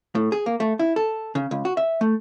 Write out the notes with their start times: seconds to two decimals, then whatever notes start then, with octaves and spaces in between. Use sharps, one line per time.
0.15 A2
0.32 G#4
0.46 A#3
0.60 A3
0.79 E4
0.96 A4
1.35 C#3
1.51 C#2
1.65 F#4
1.77 E5
2.01 A3